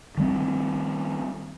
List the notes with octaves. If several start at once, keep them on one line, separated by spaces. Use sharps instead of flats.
D#3 G3 C4